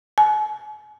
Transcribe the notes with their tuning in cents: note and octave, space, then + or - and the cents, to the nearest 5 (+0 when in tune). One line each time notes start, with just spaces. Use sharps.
G#5 +40